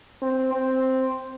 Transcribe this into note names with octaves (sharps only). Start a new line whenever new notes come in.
C4
C4